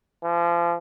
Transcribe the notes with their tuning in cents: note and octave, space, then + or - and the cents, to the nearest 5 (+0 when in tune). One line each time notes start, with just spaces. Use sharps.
F3 -35